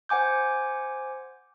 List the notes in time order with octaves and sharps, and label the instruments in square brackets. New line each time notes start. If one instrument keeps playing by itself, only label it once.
[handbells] C5 F#5 G#5 D6 G6